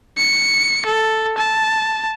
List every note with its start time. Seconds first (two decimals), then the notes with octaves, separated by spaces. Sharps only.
0.18 C#7
0.86 A4
1.38 A5